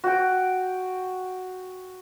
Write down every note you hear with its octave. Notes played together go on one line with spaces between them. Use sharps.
F#4 G5